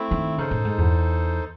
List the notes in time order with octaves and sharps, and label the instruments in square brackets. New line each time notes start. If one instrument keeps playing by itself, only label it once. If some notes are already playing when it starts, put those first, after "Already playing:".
Already playing: [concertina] A3 C4 E4
[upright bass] D#3
[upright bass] C#3 [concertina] D#4 A4 C5
[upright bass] A2
G#2
E2